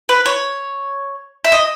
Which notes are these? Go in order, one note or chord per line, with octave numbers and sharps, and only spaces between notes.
B4
C#5
E5
D#5